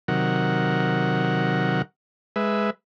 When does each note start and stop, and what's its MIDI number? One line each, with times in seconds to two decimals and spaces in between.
0.08 1.82 48
0.08 1.82 51
0.08 1.82 54
0.08 1.82 70
0.08 1.82 78
2.36 2.70 56
2.36 2.70 71
2.36 2.70 76